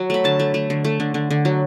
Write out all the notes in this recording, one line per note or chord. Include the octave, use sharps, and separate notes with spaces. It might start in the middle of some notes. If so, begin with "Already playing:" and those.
Already playing: F#3
A3 B5
D3 A5
A3
A3
D3
A3
D3
D3
D3
F#3